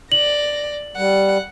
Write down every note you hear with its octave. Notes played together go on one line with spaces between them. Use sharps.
D5 A#6 F#7
G3 F#5